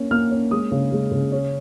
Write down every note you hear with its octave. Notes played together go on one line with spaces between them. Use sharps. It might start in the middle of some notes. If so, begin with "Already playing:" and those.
Already playing: A#3 C#4
A#3 F6
C#4
G#3 D#6
C#3
G#3
C#3
C#4